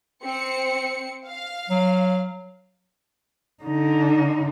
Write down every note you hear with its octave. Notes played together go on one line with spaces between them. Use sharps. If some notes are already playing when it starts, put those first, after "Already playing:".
C4 C#7
F5
F#3
D3 D#4